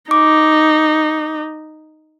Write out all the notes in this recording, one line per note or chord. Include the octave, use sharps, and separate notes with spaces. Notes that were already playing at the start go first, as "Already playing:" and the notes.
D#4 D6